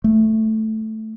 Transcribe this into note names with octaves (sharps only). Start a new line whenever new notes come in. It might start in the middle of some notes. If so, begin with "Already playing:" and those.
A3